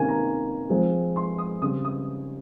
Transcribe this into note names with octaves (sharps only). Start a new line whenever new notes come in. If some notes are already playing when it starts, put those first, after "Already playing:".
Already playing: C3 D#3 A#3 C#4 G#5
A#5
F3 G#3 C4
C6
D#6
C#3 G3 C4 D#6
D#6